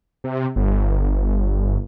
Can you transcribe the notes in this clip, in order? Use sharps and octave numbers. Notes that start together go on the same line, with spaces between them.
C3
G1